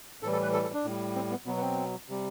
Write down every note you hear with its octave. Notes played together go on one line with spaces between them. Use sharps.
A2 E3 G3 A4
A4
B4
A4
A4
D4
A2 G3
C4
B3
B2 F#3 B3
B3
C4
C3 G3